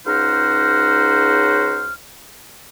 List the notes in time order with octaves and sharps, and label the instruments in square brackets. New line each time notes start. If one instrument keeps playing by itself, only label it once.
[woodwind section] C#2 C#3 D#4 F#4 C5 F6